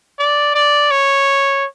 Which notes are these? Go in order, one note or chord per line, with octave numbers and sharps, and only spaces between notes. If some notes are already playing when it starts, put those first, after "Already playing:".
D5
D5
C#5